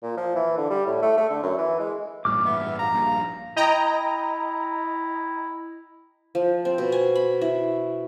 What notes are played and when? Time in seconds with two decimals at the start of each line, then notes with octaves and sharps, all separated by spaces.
0.03 A#2
0.17 F3
0.35 E3
0.58 D3
0.70 G3
0.86 A2
1.02 A3
1.17 A3
1.30 D3
1.42 F#2
1.58 E3
1.80 G#3
2.25 A1 G2 A#2 D6 F6
2.46 B3 E5
2.79 F5 A#5
2.92 A#1 G2
3.56 E4 D#5 G5 A#5
6.35 F3
6.65 C4
6.78 B2
6.92 G#5
7.15 B5
7.41 E4